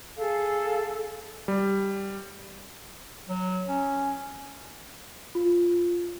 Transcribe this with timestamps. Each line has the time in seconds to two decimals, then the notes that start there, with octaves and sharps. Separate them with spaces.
0.18 G#4 A4 F5
1.48 G3
3.29 F#3
3.68 C#4
5.35 F4